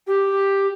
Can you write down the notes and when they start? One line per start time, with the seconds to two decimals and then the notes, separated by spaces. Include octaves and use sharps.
0.06 G4